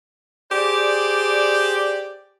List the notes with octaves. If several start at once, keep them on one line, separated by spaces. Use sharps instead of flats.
G4 G#4 C5 D5